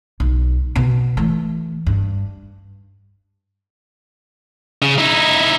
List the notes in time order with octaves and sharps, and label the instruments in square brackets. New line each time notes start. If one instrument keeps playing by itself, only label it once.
[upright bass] B1
B2 B3
E3 A3
G2
[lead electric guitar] C#3
D#4 E4